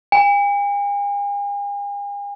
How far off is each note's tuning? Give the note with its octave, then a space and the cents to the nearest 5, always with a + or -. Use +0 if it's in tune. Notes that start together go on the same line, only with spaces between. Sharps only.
G#5 -45